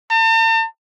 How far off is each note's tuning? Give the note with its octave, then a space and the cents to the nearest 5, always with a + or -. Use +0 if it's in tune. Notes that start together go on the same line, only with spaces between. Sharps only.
A5 +45